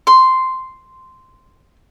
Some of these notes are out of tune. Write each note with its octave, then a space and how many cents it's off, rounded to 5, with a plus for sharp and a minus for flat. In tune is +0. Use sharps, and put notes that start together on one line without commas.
C6 -5